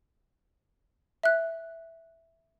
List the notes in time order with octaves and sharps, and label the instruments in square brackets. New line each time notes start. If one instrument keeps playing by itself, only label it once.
[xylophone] E5 F#6